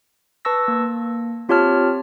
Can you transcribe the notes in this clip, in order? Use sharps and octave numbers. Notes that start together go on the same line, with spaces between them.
B4 A5 C#6 E6 A#6
A#3
C4 F4 G4 C#5 A5 F6